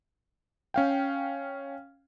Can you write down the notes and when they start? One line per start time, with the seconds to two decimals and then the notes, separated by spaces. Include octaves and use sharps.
0.74 C#4 F5 G5